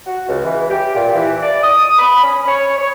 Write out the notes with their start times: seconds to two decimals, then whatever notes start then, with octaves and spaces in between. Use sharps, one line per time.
0.06 F#4
0.28 C#2
0.43 E3
0.69 G4
0.94 A#2
1.14 E3
1.42 D5
1.62 D#6
1.98 B5
2.22 C#4
2.47 C#5
2.77 C#5